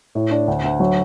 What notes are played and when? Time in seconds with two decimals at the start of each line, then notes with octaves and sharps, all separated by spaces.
0.15 A2
0.31 D4
0.48 D2
0.64 D2
0.80 F#3